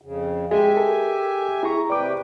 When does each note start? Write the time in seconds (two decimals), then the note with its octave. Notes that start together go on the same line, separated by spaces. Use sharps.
0.02 F2 C#3
0.51 G#3 G4 E5 G#5
0.77 A4 A#4
1.63 E4 G#4 A#5 C#6
1.90 C3 B4 D5 G5 D6